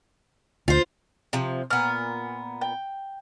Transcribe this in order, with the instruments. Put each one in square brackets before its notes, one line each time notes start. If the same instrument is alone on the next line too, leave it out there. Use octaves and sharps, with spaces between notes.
[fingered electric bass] D2 [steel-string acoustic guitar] F4 C5
[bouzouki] C3 F3
[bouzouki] A#2 B3 [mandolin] F6
[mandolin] G5